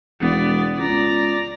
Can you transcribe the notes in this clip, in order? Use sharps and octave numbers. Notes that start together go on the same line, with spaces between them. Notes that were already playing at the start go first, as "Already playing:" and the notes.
E1 B3 D5
C#2 D5 A#5